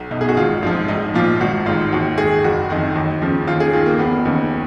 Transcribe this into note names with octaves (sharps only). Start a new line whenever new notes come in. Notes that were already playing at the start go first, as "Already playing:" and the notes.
Already playing: B1
B2 D#4
G#4
F#4
G#1 F4
G#2 F3 F4
A#1 D#4
A#2 F3 F4
G#1 F#4
G#2 D#3 F4
D#2 F#4
D#3 G#4
F#1 F#4
F2 D#3
D#2
C#3 F3
D#2 F4
G#4
D#3 F4
A#3
F1 B3
D#2 C#3